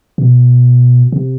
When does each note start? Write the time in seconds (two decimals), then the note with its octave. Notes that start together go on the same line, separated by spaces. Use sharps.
0.18 B2
1.12 C3